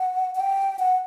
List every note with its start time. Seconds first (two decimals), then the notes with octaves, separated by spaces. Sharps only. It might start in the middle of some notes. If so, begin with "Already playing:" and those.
Already playing: F#5
0.35 F#5
0.40 G5
0.79 F#5